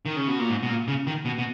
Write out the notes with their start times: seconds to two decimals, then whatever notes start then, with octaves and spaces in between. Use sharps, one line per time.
0.06 D#3
0.16 C#3
0.28 B2
0.39 A#2
0.50 G#2
0.63 B2
0.69 A#2
0.88 C#3
1.07 D#3
1.25 B2
1.39 B2